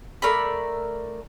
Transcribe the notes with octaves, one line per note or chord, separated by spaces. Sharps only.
A3 A#4 D5 B5